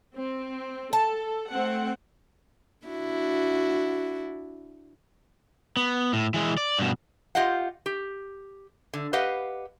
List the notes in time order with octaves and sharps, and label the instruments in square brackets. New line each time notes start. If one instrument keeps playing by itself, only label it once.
[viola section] C4
[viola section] A4 [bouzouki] A5
[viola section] A3 C4 F#5
[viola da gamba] D4 E4 F#4
[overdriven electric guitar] B3
A2
E3 G#3
D5
G2 B2
[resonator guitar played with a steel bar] F4 G4 D#5 F5 F#5
G4
D3
G4 B4 D#5 F5 F#5